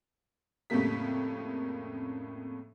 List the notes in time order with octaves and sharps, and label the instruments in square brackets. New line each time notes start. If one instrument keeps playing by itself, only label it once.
[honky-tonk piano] F2 A2 C#3 G3 A#3 B6